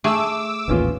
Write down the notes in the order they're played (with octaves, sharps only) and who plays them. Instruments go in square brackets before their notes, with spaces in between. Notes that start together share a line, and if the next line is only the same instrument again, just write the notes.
[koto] A3 G#4 [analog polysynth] D6 E6
[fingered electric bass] A1 D#2 [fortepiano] B3 C#4 F4